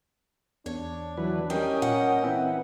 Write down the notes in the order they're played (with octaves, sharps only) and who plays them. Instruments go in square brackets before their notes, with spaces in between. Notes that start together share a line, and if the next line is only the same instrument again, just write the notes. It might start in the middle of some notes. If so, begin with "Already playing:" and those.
[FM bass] E2 [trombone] D4 [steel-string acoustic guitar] C#5
[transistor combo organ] E3 F#3 B4
[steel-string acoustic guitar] G3 [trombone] C#4 [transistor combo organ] A#4 D#5 G5
[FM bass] A#2 [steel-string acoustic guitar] F#5
[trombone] E3 [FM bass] C4 [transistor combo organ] E4 B4